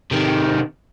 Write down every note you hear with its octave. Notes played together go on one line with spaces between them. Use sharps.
C3 D#3